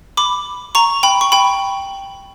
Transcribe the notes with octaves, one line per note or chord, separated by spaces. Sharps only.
B5 D6
A#5 C#6
G5 B5
C#6
G5 B5